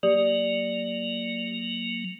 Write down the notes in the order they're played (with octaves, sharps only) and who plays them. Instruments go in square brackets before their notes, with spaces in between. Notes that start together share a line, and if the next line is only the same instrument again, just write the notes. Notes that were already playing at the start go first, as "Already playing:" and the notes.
[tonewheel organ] F#3 A#3 [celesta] G4 D5 D#6